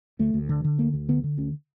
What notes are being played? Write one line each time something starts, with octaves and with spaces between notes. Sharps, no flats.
D2 A3
D2
D3
D3
D2 A#3
D2
D3 B3
D3
D2 C#4